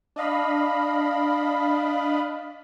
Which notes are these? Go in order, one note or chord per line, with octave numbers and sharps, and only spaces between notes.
D4 D#5 F5 B5